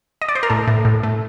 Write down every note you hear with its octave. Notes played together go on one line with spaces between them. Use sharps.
D#5
D5
C5
A#4
A2 A4
A2
A2
A3